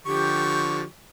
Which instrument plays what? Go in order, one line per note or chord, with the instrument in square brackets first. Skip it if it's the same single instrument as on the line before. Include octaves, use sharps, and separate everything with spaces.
[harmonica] D3 F3 C#6 [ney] G4